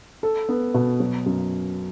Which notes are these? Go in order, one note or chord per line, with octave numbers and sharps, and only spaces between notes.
A4
B3
B2
F#3
F#2